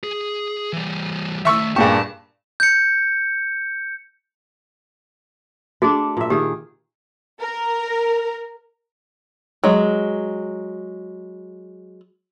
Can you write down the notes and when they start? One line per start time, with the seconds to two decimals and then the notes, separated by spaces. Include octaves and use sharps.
0.03 G#4
0.73 E3 G3
1.45 D#3 A3 E5 C#6 E6
1.76 G2 A#2 G4 G#4 A5 C#6
2.60 G6 C#7
5.82 A3 D4 F#4 G#4
6.17 A#2 E5
6.30 D#3 G4 G#4
7.40 A#4
9.64 F#3 G#3